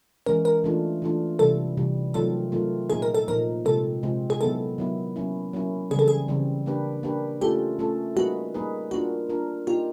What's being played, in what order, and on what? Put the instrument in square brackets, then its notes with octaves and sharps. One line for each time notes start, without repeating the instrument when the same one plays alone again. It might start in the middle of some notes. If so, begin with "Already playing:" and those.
[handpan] E3 G#3 C#4 [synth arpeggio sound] A#4
[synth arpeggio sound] A#4
[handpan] E3 A3 D4 F4
E3 A3 D4 F4
[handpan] C3 E3 G3 [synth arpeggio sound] A4
[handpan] C3 E3 G3
[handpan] D#3 F#3 A3 C4 F4 [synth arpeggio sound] A4
[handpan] D#3 F#3 A3 C4 F4
[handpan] A#2 F3 A#3 D#4 [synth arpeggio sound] G#4
[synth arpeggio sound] A#4
A4
[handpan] A#2 F3 A#3 D#4 [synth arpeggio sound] A#4
[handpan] C3 F3 G#3 C4 F4 [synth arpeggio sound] A4
[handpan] C3 F3 G#3 C4 F4
[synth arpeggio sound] G#4
[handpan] D#3 F#3 B3 E4 [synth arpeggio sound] A4
[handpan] D#3 F#3 B3 E4
F#3 A#3 C#4 E4
F#3 A#3 C#4 E4
[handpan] C#3 E3 G3 C4 [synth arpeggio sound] G#4
[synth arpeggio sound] A4
G#4
[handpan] C#3 E3 G3 C4
A#3 D4 G4 B4
A#3 D4 G4 B4
[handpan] A3 C#4 F4 A4 [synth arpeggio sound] G4
[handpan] A3 C#4 F4 A4
[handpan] G3 A#3 D#4 G#4 B4 [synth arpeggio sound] F#4
[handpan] G3 A#3 D#4 G#4 B4
[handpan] A#3 D4 F4 A#4 [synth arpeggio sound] F#4
[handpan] A#3 D4 F4 A#4
[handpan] A#3 D#4 G4 [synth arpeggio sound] F4